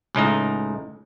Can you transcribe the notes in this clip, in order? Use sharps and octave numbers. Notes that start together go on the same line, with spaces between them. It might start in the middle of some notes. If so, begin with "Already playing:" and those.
C#2 A2 D#4 A#5